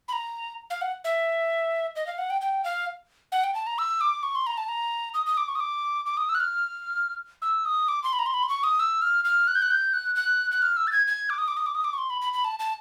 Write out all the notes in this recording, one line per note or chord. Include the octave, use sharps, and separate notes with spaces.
B5
A#5
F5
F#5
E5
D#5
F5
F#5
G5
G5
F5
F#5
G5
A5
A#5
E6
D6
C#6
C6
A#5
A5
A#5
D#6
D#6
D6
C#6
D#6
D6
D6
D#6
E6
F#6
F6
E6
D#6
D6
C6
B5
A#5
C6
B5
C6
C#6
D#6
E6
F6
F6
F#6
G6
F#6
G6
F#6
F#6
F#6
F6
E6
A6
G#6
G#6
D6
D#6
D6
D#6
D6
D#6
D6
C#6
C6
B5
B5
B5
A5
A5